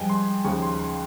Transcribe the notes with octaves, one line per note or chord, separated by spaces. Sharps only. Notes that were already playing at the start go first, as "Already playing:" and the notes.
Already playing: G2 F3 G#3 G5 G#5
C6
D#2 C#3 F3 G#3 C#6
C6
C6